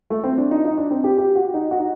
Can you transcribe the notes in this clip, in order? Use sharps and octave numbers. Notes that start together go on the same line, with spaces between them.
A3
C4
D4
D#4
D#4
D4
C4
G4
G4
F#4
D#4
F#4
D#4